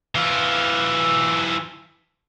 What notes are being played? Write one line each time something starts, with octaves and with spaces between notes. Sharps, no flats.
E3 F4